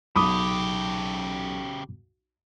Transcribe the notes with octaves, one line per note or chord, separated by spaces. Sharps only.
B1 C#3 G4 B5 D6 D#6